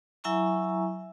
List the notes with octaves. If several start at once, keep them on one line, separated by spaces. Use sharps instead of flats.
F#3 E4 E5 G#5 A#5 C#6